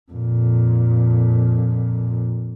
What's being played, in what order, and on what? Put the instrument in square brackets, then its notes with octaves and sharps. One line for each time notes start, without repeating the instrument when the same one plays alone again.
[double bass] F2 A#2